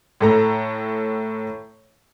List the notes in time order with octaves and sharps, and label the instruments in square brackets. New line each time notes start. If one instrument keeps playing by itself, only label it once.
[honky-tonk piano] A2 A4 A#5